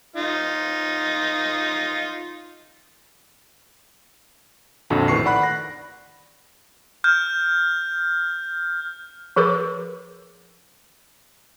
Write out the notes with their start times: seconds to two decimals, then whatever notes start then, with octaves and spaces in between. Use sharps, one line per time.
0.16 D#4 F4
4.90 A#1 F2 D3 F#4 A4
5.08 A2 D#3 B4 C#6 C7
5.25 D5 F#5 B5 F#6
5.43 A#6
7.04 F6 G6
9.36 F3 G#4 A#4 B4 D6